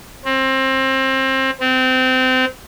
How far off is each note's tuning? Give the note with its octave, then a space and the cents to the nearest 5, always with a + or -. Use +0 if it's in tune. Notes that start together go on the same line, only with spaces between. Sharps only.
C4 +25
C4 -25